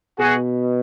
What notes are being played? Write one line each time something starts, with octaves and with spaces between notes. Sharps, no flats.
B2 F#4 G#4